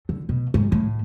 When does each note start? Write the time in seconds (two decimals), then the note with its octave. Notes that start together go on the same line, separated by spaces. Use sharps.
0.09 D3
0.29 B2
0.54 G#2
0.72 A2